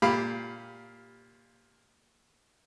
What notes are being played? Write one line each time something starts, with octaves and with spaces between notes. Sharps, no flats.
A#2 G4 F5 B5